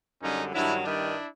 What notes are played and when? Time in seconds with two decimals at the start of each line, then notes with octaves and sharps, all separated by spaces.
0.23 F#2 D3 G3 C#4 D#4
0.53 G2 D#3 F#3 D4 E4
0.84 G2 D#3 G3 D4 E4